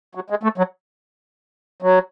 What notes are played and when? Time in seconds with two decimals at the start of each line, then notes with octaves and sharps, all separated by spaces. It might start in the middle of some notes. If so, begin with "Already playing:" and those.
0.15 F#3
0.30 G#3
0.43 A3
0.58 F#3
1.82 F#3